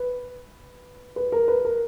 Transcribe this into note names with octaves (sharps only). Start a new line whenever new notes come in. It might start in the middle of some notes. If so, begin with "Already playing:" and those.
Already playing: B4
B4
A#4
B4
A#4